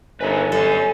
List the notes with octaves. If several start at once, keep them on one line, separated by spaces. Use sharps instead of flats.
G1 D#4 A#4 B4 G#5
F#2 A4 C#5